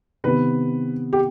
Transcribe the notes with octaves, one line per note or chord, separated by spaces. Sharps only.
C3 D#3 B3 B4
G4